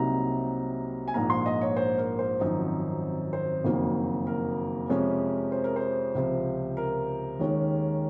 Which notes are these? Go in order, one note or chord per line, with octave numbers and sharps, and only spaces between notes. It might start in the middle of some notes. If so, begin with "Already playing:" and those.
Already playing: C2 C3 F#3 A#3 D#4 A#5
G#5
A#1 G#2 F3 A#3 A#5
C6
D#5
C#5
C5
A#4
C5
G#1 F#2 F3 C4 D#4
C5
F#1 F2 D#3 F#3 A#3
A#4
F2 C3 F3 G#3 C#4
C5
A#4
C5
C#2 C3 F3
A#4
D#2 D#3 G#3 C#4